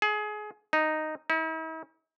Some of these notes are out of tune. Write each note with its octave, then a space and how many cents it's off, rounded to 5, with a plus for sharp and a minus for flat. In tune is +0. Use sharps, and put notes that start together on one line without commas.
G#4 +25
D#4 -5
E4 -45